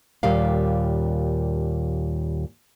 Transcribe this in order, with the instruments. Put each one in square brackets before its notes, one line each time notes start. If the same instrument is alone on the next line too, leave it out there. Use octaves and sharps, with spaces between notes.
[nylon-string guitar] D#2 A#2 G3 A#3 F5